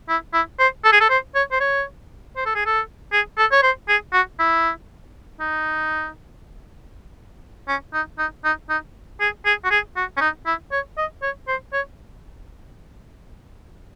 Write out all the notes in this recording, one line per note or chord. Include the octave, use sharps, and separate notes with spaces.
E4
E4
C5
A4
G#4
A4
C5
C#5
C5
C#5
C5
A4
G#4
A4
G#4
A4
C#5
C5
G#4
F#4
E4
D#4
C#4
D#4
D#4
D#4
D#4
G#4
G#4
F#4
G#4
F#4
C#4
D#4
E4
C#5
D#5
C#5
C5
C#5